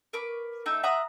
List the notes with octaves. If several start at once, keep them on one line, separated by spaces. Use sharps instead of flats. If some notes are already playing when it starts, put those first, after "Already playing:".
A#4 B4 C#6 D6
A3 D#4 E5 G5
E5 F#5 A#5 D#6